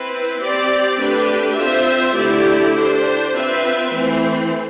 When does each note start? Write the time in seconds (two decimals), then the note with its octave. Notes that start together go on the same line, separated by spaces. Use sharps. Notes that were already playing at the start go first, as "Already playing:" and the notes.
Already playing: C4 E4 B4
0.40 C4 G4 D5
0.99 A3 D4 G4 B4
1.57 C4 F4 C5 E5
2.17 D3 A3 E4 G4 D5
2.76 D4 G4 C5
3.36 C4 F4 B4 E5
3.94 E3 A3 C4